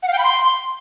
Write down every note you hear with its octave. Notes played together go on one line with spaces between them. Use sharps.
F#5
F5
G5
B5
C6